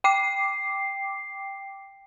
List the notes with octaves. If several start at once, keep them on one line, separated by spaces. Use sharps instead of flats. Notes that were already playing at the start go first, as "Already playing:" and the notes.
G5 D6 C7